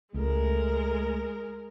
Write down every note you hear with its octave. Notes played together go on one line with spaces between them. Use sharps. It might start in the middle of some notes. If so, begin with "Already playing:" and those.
C#2 G#3 A3 A#4